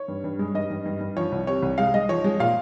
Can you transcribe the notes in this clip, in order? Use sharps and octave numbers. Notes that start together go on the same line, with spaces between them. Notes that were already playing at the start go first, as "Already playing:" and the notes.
Already playing: C#5
G2
G2
G#3
G2 D#5
G2
G2
G2
F3 C#5
C2
C3 C#5
C2
G#3 F5
G#3 D#5
F3 C#5
G#3
A#2 F5